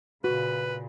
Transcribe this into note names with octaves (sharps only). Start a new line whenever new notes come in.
A#2 C#3 F#4 B4